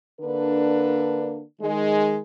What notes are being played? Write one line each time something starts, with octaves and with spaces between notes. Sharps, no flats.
D3 A#3 D4 B4
D#3 G#3